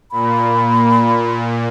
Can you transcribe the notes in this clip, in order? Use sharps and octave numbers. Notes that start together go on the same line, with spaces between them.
A#2 B5